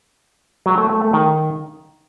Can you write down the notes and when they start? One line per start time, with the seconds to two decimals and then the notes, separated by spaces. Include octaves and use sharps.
0.66 F#3
0.78 A3
0.90 A3
1.02 A3
1.13 D#3